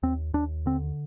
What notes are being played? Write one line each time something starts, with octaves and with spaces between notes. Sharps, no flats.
D#2 C4
D#2 D4
D3 C4